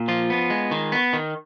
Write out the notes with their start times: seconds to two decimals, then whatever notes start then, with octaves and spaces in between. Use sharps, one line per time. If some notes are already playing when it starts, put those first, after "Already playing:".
Already playing: A#2
0.08 F3 F4
0.30 B3
0.50 G#3
0.71 D#3
0.92 B3
1.13 D#3